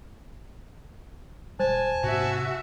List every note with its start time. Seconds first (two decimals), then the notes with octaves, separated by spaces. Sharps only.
1.60 D#1 G3 C5 G#5 A5
2.03 G#2 C3 C4 F#4 E5